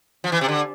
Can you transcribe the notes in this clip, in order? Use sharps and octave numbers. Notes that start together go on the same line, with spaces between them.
F3
E3
C3
D3